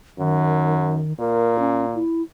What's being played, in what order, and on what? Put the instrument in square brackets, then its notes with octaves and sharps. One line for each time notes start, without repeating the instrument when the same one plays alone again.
[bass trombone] F#2 [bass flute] D#3
[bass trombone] A#2 [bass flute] A#4
[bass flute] C#4
E4